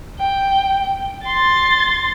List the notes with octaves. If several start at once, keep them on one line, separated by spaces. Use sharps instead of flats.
G5
C6 A6